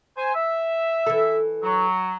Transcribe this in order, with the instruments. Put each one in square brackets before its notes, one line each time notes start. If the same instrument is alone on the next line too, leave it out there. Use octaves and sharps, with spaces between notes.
[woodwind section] C5 G#5
E5
[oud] E3 A4
[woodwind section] F#3